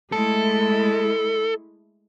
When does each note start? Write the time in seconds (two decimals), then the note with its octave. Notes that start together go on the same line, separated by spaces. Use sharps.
0.12 G#3 A3 E4 A4